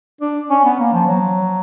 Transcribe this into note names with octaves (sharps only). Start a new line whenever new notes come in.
D4
C#4
B3
A#3
F3
F#3